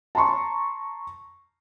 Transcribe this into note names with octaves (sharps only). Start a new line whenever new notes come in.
A5 A#5 C6 C#6